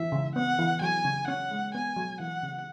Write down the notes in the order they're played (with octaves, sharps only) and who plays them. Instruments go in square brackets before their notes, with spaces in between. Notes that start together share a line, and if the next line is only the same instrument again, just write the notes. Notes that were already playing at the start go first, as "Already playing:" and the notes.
Already playing: [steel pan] E3 [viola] E5
[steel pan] C#3
[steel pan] B3 [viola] F#5
[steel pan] E3
[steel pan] F#3 [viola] G#5
[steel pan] C#3
[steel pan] C#4 [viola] F#5
[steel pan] G#3
[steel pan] B3 [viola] G#5
[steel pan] F#3
[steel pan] E3 [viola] F#5
[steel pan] C#3